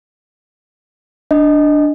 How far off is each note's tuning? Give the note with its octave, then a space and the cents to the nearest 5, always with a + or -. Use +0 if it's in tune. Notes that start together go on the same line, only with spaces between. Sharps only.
D4 +0 D#5 +0